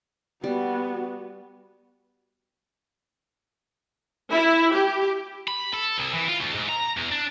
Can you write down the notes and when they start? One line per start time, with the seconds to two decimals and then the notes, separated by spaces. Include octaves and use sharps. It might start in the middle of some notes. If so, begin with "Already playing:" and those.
0.44 G3 B3 F#4
4.32 E4
4.72 G4
5.48 B5
5.74 A4
5.98 C2
6.13 E3
6.28 F4
6.40 D2
6.55 G#2
6.69 A#5
6.97 E2
7.11 D4